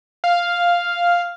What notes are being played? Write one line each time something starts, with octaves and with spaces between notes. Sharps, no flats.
F5